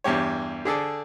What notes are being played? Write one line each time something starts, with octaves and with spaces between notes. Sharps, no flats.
E2 G2 G4 C#5
D3 G#4 A4 D5